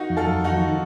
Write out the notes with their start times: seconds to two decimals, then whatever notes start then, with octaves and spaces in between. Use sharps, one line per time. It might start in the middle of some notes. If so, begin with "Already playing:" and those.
Already playing: D#4 F4 F#4 A#4
0.10 F2
0.17 F4 A4
0.31 F2
0.44 D#4 F#4
0.52 D#3